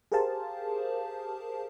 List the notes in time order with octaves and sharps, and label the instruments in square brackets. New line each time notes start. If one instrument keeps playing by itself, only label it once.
[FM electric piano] G4 G#4 A#4 C5 F5 A5